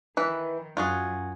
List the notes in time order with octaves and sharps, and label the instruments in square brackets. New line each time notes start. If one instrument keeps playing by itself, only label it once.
[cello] D#3 [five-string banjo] E3 B4
[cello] F#2 [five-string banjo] F4 F#4 G#4